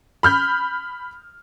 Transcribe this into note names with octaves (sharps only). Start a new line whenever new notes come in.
B5 F6 G6